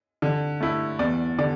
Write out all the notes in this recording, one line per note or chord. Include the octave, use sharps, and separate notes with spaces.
D3
A3 E4
E2 D5
D3 D5